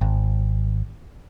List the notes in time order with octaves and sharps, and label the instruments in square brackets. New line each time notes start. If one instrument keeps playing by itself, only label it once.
[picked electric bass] G#1